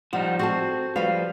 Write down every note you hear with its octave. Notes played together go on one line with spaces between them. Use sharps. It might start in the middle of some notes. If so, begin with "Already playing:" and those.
F3 G3 D#4 F#5
C4 F#4 A4 A5
F3 G3 B4 F5